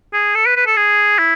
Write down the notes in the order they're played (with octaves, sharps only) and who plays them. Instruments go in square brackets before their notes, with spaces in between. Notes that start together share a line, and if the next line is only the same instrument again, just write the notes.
[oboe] G#4
A4
B4
B4
A4
G#4
E4